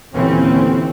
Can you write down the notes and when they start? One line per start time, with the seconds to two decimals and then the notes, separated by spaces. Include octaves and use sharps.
0.15 D#2 A#2 D3 E3 C4 C#4